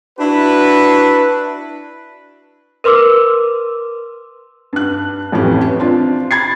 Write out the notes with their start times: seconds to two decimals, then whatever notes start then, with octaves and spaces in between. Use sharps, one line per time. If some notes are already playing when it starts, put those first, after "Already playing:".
0.19 D4 E4 F#4 B4
2.84 A#4 B4 C6 D6 E6
4.73 G2 F#6
5.32 A1 F2 A2 E3 C#4 G4
5.80 C4 D4 F4
6.31 B5 G#6 A6 C7